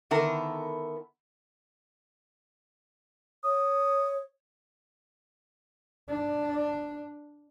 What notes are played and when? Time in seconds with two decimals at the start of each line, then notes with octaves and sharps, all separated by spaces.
0.11 D3 D#3 B3 E4 A4 A#4
3.44 C#5 D#6
6.09 D4